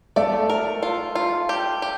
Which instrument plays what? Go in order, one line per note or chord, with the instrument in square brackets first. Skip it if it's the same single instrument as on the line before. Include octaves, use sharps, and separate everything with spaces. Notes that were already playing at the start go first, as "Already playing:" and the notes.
[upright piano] A3 [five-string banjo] D5
[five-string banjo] A#4
F4
F4
G4
G4